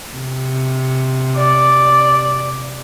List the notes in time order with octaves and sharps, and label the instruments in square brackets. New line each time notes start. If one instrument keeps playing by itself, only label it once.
[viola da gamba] C3
[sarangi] D5